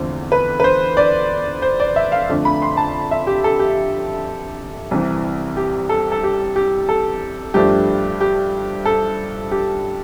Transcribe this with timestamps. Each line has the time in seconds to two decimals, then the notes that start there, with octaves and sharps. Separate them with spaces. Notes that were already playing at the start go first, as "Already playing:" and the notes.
Already playing: E2 D3 F3 A3 C4
0.32 B4
0.60 B4
0.64 C5
0.97 D5
1.62 C5
1.80 D5
1.96 E5
2.12 F5
2.29 F2 D3 A3 D4
2.45 B5
2.62 C6
2.77 A5
3.11 E5
3.27 G4
3.44 A4
3.59 G4
4.91 C2 C3 E3
5.57 G4
5.89 A4
6.12 A4
6.23 G4
6.56 G4
6.89 A4
7.54 G2 F3 A3 D4 G4
8.21 G4
8.85 A4
9.51 G4